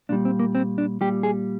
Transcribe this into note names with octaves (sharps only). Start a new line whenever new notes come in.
A#2 G3 D4
C4
A#3
C4
D4
A#2 G3 G4
G#4